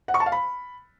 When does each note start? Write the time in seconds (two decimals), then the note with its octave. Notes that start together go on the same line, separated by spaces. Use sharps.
0.08 F#5
0.14 C#6
0.20 A5
0.26 F5
0.32 B5